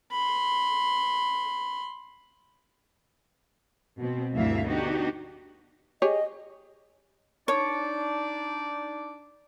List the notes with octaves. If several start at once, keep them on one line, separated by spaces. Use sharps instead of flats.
B5 C6
B2 C4
D2 G2 E3 A3 E5 F5
B3 D4 D#4 F#4 G4
G4 G#4 C#5 D#5
D4 D#4 C#5 D5